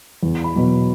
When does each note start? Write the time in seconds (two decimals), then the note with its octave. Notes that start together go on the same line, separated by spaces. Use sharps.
0.23 E2
0.44 B5
0.55 B2 F#3